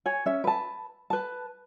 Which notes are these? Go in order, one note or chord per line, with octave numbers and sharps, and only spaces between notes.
C#5 G#5
C#4 E5
B4 A5
B4 A5